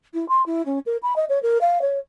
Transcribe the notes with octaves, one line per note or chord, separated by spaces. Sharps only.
E4
C6
E4
C#4
A#4
B5
D#5
C#5
A#4
F5
C#5